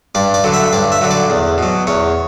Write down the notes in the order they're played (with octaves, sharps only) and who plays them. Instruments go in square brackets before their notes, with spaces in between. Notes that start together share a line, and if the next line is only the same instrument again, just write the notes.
[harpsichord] G2 D5
D5
D3 F#3
E5
G2 D5
E5
D3 F#3
D5
E2
B2 F#3
E2 C#5